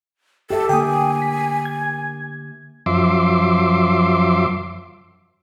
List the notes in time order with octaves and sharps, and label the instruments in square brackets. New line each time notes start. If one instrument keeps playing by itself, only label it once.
[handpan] G4 E5 [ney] A4
[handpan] D3 A#3 [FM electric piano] G5 D#6 [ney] G#5
[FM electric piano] B6
G#6
[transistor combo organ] F#2 F3 E5 C6 D6